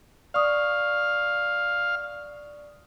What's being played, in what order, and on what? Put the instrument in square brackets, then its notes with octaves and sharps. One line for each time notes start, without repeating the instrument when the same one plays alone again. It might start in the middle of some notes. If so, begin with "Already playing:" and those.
[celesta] D5 C#6 D#6 [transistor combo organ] F5